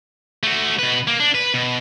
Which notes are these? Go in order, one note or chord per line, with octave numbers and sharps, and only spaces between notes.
A3 F#4
B2 B4
A#3
D4
B4
B2